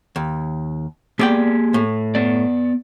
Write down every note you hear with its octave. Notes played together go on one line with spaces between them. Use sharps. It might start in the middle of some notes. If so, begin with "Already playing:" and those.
D#2
A#3 B3 G4 G#4 D5 G5
A2
B3 D5